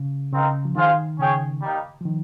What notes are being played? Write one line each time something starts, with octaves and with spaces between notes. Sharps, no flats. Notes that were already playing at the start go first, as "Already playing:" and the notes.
Already playing: C#3
C#3 C4 D#4 A#4 F5
F3
D#3 F4 G#4 C5 F5
C#3 C#4 G#4 C#5 G5
G3 A#3 D#4 G4
F3
D#3